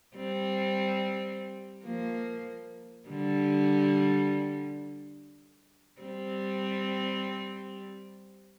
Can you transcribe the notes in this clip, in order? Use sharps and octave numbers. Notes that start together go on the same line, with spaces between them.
G3 C4
F3 A#3
D3 G3
G3 C4